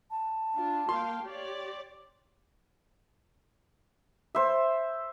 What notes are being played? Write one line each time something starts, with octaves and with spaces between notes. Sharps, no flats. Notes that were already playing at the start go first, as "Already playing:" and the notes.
A5
D4 F4
A#3 F5 G5 C6
G4 C#5 D5
C5 E5